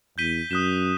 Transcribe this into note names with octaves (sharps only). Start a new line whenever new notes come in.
E2 G6 B6 D#7 G7
F#2 D#6 F#6 B6 E7